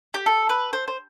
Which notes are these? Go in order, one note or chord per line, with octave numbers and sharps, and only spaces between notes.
G4
A4
B4
C5
C5